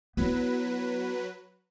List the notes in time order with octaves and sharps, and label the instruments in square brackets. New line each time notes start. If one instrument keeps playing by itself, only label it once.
[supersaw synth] F#3 B4 [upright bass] B3 E4